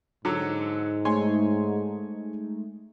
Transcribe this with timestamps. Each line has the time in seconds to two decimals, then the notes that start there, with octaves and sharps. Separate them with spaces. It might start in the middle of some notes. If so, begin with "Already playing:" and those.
0.25 G#2 D3 F#3 E6
1.05 G#3 A3 D#4 C#5 G#5 C6